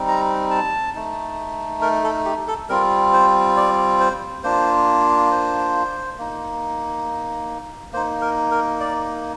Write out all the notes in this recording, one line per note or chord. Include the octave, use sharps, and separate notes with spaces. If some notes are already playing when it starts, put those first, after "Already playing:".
Already playing: G3 C4 D#4
A#5
A5
A3 D#4
A#4
A4
G4
A4
G3 C4 F4 A#4
C5
D5
C5
A#3 D4 F4 C5
C5
A#3 D#4
A#3 D#4 C5
A#4
A#4
D5